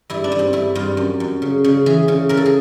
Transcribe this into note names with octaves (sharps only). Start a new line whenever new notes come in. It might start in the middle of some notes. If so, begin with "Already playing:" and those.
G2 E4
D4
G2
C4
G2 E4
G2 F4
F#2
F#2
C#3
C#3
E3 G#4
C#3
C#3 A#4
A4
G#4